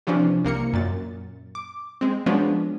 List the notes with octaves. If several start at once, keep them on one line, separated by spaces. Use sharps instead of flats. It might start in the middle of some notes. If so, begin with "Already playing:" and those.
C3 E3 F3 C#4 D4
C2 A#3 A#4 C#7
F#2 A#2 A6
D6
G#3 C4
F3 F#3 G#3 B3 C#4 D4